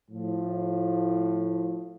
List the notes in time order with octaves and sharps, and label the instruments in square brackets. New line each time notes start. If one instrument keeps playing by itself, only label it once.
[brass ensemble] A2 F3